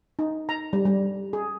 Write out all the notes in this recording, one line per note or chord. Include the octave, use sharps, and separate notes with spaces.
D#4
A#5
G3
G3
G#4